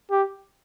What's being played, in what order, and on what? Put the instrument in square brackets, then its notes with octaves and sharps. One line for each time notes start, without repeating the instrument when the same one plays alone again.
[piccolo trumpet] G4